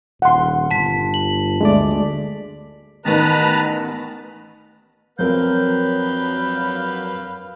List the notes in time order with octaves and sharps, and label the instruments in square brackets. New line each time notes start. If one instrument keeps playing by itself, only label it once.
[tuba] D#1 [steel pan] F#5 C6
[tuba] G1 [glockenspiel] A5 B6
[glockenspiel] F#7
[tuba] D2 [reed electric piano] G#3 A3 D5
[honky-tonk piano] A1 D#3 B3 [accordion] B4 A5 A#5
[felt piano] F2 C4 A#4 [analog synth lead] F#3 [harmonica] B4 F5 [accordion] G6